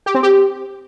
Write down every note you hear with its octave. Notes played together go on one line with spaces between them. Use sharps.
G4
C4
G4